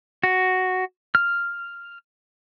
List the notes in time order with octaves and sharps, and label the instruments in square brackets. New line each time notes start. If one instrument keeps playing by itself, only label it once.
[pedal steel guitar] F#4
F6